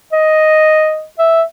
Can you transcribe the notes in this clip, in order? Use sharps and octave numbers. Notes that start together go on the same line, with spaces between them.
D#5
E5